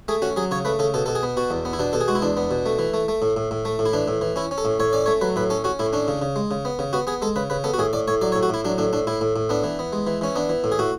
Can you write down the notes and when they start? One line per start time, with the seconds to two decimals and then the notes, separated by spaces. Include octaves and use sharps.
0.08 A3 G#4
0.22 C#4 F#4
0.36 F#3 G#4
0.51 C#3 C#5
0.65 A3 B4
0.79 C#3 A4
0.94 B2 A4
1.06 B2 A4
1.15 G#4
1.23 B3
1.37 B2 F#4
1.51 E2
1.65 B3
1.73 E4
1.79 B2 D4
1.93 B2 A4
2.01 G#4
2.08 G#3 F#4
2.15 E4
2.22 E2 D4
2.37 B3
2.51 B2
2.66 A3
2.79 E3
2.94 A3
3.08 A3
3.22 A2
3.37 A2
3.51 A2
3.65 A3
3.79 A2
3.86 E4
3.93 E3 D4
4.08 A2
4.21 E3
4.36 C#4 E4
4.51 C#4
4.58 A4
4.65 A2
4.80 A2 C#5
4.93 C#4 D5
5.06 A3 C#5
5.21 F#3 B4
5.36 A2 B4
5.50 C#4 A4
5.64 C#4 F#4
5.79 A2 E4
5.93 C#4 D4
6.08 C#3
6.22 C#3
6.36 G#3
6.51 C#3
6.65 B3
6.79 C#3
6.93 B3 F#4
7.07 B3 G#4
7.22 G#3 A4
7.36 C#3 B4
7.50 C#3 B4
7.64 B3 A4
7.74 F#4
7.78 A2 G#4
7.93 A2 D5
8.08 A2 C#5
8.21 F#3 D5
8.32 C#5
8.36 A2
8.43 F#4
8.50 A2 E4
8.65 F#3 D4
8.78 A2 D4
8.93 A2 D4
9.07 A2 E4
9.21 A2
9.36 A2
9.49 B3 D4
9.64 E3
9.79 B3
9.93 G#3
10.07 E3
10.21 E3 C#4
10.35 B3 D4
10.49 E3
10.64 A2
10.72 G#4
10.79 A2 F#4